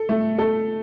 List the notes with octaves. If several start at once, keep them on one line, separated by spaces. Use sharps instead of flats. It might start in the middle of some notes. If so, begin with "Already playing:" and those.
Already playing: A4
A3
A4